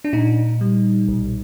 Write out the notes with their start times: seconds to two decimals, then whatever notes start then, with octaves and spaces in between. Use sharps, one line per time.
0.04 D4
0.13 A#2 D#4
0.61 G3
1.08 B1